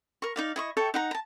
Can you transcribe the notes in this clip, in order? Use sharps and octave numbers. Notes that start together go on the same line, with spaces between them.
A#4 C#6
D#4 D5 F5
E4 D#5 C#6
A4 C#5 E5 G5
D#4 F#5 A#5
A5 A#5